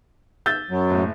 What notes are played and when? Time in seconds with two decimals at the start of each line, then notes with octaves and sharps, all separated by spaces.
0.46 E6 G6 A6
0.70 F#2 F#3
0.90 F#1 A2